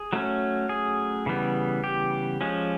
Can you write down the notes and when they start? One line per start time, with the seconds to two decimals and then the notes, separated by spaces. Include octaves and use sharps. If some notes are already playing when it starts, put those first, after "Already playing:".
Already playing: G#4
0.13 F#3 A3 C#4
0.69 G#4
1.26 C#3 E3 G3 B3
1.84 G4
2.41 F3 G#3 C#4